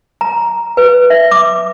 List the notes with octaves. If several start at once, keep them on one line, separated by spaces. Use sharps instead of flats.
A#5
B4
E5
D6